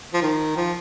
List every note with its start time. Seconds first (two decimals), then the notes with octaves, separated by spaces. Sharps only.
0.14 F3
0.22 D#3
0.57 F3